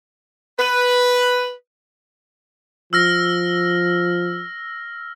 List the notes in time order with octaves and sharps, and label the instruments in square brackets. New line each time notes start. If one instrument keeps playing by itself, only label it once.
[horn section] B4
[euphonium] F3 [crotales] E6 F6 A#6